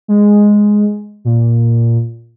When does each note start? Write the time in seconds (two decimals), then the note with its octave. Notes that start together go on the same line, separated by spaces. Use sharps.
0.08 G#3
1.25 A#2